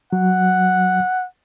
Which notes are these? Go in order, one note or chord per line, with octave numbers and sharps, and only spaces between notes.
F#3 F#5